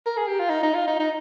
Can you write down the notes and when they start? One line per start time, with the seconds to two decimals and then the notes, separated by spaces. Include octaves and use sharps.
0.06 A#4
0.17 G#4
0.28 G4
0.40 F4
0.50 D#4
0.63 D#4
0.75 F4
0.88 D#4
1.00 D#4